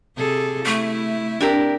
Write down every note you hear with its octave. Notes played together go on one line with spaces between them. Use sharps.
C3 G#4 A4
A3 E4
C4 D4 G4 A#4